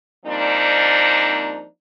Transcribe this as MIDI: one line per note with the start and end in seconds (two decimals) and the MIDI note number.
0.25 1.64 53
0.25 1.64 55
0.25 1.64 58
0.25 1.64 60
0.25 1.64 62
0.25 1.64 63